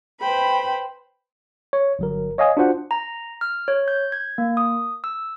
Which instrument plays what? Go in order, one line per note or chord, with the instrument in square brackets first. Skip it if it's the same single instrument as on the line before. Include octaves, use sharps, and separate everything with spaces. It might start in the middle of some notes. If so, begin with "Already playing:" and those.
[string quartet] B4 C5 G5 B5
[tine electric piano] C#5
G1 F#3 A#4
C#5 D#5 F5 G#5 D#6
D4 F4 F#4 C5 F#5
[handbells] A#5
F6
C#5
G6
G#6
A#3
D#6
E6